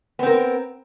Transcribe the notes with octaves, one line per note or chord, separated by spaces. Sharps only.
B3 C4 A#4